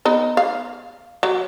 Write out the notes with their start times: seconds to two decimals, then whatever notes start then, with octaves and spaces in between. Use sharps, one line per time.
0.05 B3 D#4
0.37 F5
1.23 F#3